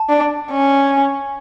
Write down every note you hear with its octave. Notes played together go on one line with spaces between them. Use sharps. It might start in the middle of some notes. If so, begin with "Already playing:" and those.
Already playing: A5
D4
C#4